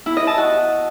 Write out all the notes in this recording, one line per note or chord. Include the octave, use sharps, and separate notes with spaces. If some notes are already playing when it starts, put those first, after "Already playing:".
E4
D#5
A5
F#4